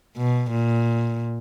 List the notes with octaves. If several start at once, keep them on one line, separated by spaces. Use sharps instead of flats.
B2
A#2